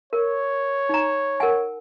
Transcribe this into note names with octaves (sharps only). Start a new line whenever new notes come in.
A#4 C#5
D#4 A#5
A#4 F#5 G#5